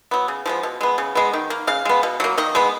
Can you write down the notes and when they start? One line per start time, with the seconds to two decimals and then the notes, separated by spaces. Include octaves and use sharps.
0.11 F#3 B3
0.28 C#3
0.46 F3 G#3 B3
0.63 B2
0.81 G#3 B3
0.98 C#3
1.15 G#3 B3
1.33 D#3
1.50 A#3
1.67 C#3 F5
1.85 G#3 B3
2.03 B2
2.20 F#3 A#3
2.37 D#3 D#5
2.55 G#3 B3